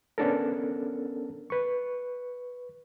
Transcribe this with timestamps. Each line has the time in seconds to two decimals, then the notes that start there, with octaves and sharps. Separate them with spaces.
0.18 B3 C#4 D4 A4 A#4
1.50 B4 C#6